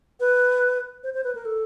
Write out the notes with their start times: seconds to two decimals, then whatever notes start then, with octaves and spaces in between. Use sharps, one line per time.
0.20 B4
1.04 C5
1.14 C5
1.24 B4
1.35 A#4
1.45 A4